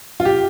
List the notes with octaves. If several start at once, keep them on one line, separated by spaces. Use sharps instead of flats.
F4
G4